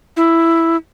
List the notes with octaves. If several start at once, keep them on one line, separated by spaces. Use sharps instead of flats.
E4